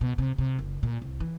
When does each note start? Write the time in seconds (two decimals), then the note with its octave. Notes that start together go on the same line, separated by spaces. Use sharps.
0.01 B2
0.18 C3
0.38 C3
0.59 F#1
0.83 A#2
1.02 C2
1.20 E3